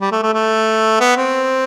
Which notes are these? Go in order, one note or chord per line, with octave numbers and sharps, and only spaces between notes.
G3
A3
A3
A3
B3
C4